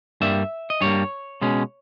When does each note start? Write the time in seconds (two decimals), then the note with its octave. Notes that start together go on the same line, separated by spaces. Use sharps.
0.21 G2 G3 A#3 E5
0.70 D#5
0.81 G2 G3 A#3 C#5
1.41 B2 G#3 C#4